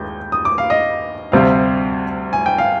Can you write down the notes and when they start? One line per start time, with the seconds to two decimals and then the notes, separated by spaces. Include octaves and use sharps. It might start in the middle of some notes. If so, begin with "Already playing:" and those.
Already playing: D#2 G#3 G6
0.32 D#6
0.45 D6
0.58 F5
0.70 D#5
1.32 D2 C3 G3 C4 F5
2.33 G#5
2.46 G5
2.58 F5